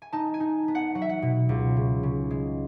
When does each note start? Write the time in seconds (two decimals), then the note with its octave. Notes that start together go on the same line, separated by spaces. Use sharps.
0.02 G#5
0.13 D#4 A5
0.34 G#5
0.40 D#4
0.68 B3
0.75 F#5
0.95 F#3 F#5
1.02 E5
1.09 F#5
1.22 B2
1.49 C#2
1.77 C#3
2.03 C#3
2.30 G#3